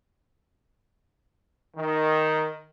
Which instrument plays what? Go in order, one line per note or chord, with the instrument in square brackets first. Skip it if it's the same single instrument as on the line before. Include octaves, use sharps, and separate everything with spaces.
[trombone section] D#3